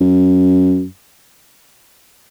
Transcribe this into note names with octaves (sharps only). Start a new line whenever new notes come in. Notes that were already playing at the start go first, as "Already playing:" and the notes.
F#2